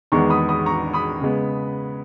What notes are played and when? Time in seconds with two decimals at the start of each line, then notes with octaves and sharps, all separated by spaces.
0.12 E2 D#3 G#3 B3 A#5 C#6
0.30 B5 D#6
0.49 B5 D#6
0.66 A#5 C#6
0.93 B5 D#6
1.21 C#3 G#3 B3